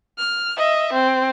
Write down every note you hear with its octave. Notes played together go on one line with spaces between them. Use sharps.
F6
D#5 E5
C4